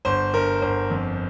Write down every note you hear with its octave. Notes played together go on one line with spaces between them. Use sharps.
G1 C5
G1 A#4
G1 C5
F2